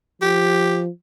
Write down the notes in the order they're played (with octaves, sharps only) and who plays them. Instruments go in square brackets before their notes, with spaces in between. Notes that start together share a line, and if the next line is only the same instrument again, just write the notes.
[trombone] F3 [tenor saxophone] G4